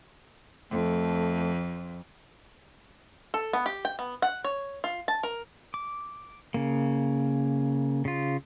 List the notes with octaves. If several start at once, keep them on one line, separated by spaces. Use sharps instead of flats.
F2 A3
A4
B3
G4
G5
B3
F#5
C#5
F4
A5
A#4
D6
C#3 A#3
C#3 F4